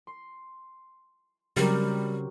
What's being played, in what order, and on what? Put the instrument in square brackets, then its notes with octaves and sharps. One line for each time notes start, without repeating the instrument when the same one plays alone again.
[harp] C6
[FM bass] C#3 [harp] F#3 C4 [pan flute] G3 [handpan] G4 A#4